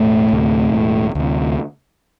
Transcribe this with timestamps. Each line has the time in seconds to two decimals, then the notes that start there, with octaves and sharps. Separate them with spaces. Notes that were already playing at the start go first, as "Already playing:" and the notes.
Already playing: E1 A2 A3
0.32 D2 C3
0.73 E1
1.15 D2 C3